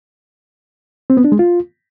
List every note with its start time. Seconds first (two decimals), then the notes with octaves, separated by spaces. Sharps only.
1.10 C4
1.17 B3
1.24 D4
1.32 G#3
1.39 F4